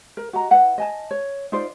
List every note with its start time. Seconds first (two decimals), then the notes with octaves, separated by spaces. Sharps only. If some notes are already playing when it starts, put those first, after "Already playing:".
0.17 A#4
0.33 F#4 D#5 A#5
0.51 E4 B4 F#5
0.78 D#5 G#5 A5
1.11 C#5
1.52 D#4 F4 C5 D5